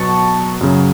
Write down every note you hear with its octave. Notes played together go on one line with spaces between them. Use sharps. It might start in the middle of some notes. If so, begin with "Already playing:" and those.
Already playing: B2 F#3 B3 A5 C#6
F#2 C#3 F#3